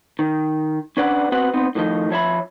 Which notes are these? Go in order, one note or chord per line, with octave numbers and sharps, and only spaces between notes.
D#3
C#4 D4 B4 D5 F#5
B3 C4 F#4 B4 F#5
B3 C4 D#4
A2 D3 D#3 F3 D#4
F3 C#5 E5 B5